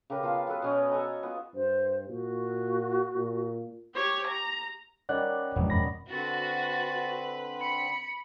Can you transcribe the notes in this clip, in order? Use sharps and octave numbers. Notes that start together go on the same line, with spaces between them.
C#3 G4 A#4 B4
B3 F4 F5 A5
B3 F#4 A4 B4
B2 C#4 D#5
A4 G#5 A#5
B3 F4
G2 C5
A#2 F#4
A#2
G4 C#5
A#5
D#3 G3 C#4 D5 F#5 F#6
E1 F2 G#2 B3
F#2 B5 A#6
D3 C4 F#4 B4 A6
B5 C#7